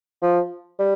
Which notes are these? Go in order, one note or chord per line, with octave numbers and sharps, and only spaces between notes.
F3
G3